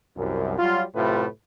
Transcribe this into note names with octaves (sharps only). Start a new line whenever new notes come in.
C2 F#2
F#3 G3 F4
F#2 A2 C3 A3 F4 B4